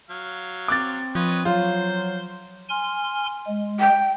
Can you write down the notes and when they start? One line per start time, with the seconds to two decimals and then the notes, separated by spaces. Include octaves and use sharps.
0.10 F#3 F5
0.68 C4 D6 F#6 A6
1.15 F3 B4 C#5 D#5
1.45 F#3 F4 C5
2.69 G#5 C6 F6
3.47 G#3
3.80 G5